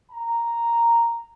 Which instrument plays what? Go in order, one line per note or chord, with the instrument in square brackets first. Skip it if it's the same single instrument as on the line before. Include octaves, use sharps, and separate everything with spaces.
[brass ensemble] A#5